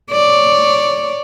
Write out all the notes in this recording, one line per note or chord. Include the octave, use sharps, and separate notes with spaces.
C#5 D5